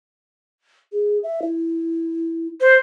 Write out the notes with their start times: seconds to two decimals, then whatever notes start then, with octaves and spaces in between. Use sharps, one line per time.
0.92 G#4
1.23 E5
1.42 E4
2.61 C5